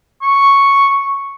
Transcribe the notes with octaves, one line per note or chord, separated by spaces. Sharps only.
C#6